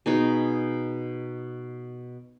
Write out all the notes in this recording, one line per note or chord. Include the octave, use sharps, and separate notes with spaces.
B2 D#4 G#4